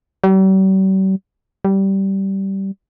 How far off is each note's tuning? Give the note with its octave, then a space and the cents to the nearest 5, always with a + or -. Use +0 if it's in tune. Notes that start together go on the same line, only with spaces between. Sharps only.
G3 -45
G3 -15